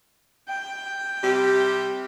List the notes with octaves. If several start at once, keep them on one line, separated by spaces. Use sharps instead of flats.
G5
C3 G3 G4